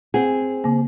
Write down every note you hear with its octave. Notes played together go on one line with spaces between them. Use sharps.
C4 G#4 F#5
C#3 A#3